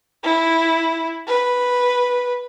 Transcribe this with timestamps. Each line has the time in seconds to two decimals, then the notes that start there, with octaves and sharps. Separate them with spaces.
0.23 E4
1.27 B4